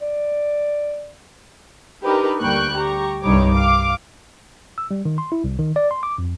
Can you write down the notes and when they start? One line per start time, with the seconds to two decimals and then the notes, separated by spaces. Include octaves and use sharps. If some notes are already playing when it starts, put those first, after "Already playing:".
0.02 D5
2.04 D4 D#4 G4 A#4 B4
2.41 D2 G3 A#3 G5 C#6 F#6
2.77 G4 A#5 C#6
3.22 C2 G2 G3 D#4 C#5 D6
3.54 F5 D6
4.78 E6
4.91 G3
5.05 D#3
5.18 C6
5.32 E4
5.44 C2
5.59 D#3
5.76 D5
5.91 C6
6.03 D6
6.18 F2